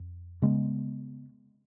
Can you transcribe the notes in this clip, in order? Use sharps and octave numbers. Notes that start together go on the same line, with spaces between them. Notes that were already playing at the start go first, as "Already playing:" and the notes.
Already playing: F2
C#3 G#3 B3